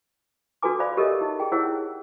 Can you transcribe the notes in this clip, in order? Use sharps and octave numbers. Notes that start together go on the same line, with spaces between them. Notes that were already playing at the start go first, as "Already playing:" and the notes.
D4 F#4 A4 B4 G#5 D6
C5 D5 F5 B5
G4 A4 A#4 C#5 D#5 E5
D#4
G#4 G5
E4 G#4 C5 C#5 F#5 E6